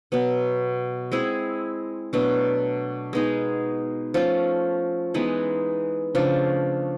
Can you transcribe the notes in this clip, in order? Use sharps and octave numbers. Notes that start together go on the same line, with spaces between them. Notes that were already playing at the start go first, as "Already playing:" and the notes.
B2 F#3 B3
G#3 C4 E4 G#4
B2 F#3 A3 D4
G#3 B3 D#4 G#4
F3 A3 C#4 F4
E3 G#3 B3 D#4
C#3 F3 A3 D4